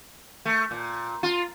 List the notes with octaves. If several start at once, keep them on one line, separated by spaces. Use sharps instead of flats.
A3
A#2
F4